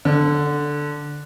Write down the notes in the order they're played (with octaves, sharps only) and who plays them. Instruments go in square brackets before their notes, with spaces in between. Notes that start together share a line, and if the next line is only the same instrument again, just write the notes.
[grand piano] D3